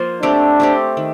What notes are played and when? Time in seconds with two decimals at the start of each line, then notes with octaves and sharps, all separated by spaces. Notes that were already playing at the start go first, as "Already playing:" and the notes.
Already playing: F3 A#3 F4 C5
0.22 A3 C4 D4 G4
0.60 A3 C4 G4
0.97 D#3